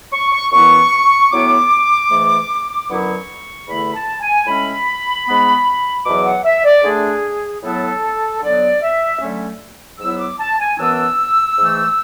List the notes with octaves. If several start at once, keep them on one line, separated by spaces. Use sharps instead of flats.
C#6
C#6
F#2 E3 B3 E4 C#6
A2 F#3 B3 E4 D6
G#2 E3 A3
F#2 D3 F#3 B3 E4 C#6
E2 D3 A3 E4 B5
A5
G#5
A2 G#3 C#4 E4 B5
G#2 G#3 B3
E2 B2 F#3 D6
F#5
E5
D5
D3 A3 D4 G#4
A2 F#3 B3 E4 A4
D3 F#3 B3 D5
E5
D3 F#3 A3 C#4
G#2 F#3 B3 E4 E6
D6
A5
G#5
F#2 E3 B3 D4 E6
G#2 E3 A3